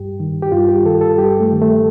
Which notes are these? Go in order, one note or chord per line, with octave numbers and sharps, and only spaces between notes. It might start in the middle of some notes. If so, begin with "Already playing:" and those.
Already playing: G2 G4
D#3
G4
G2 F4
G4
D#3 A4
A4
G2 G4
A3
D#3
A3